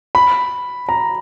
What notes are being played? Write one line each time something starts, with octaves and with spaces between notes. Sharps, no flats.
B5
A#5